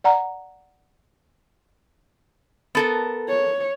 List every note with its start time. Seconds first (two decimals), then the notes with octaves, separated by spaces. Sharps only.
0.04 D5 F#5 A#5
2.75 B3 A4 A#4
3.28 C#5